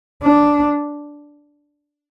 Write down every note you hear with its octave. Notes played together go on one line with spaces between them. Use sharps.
D4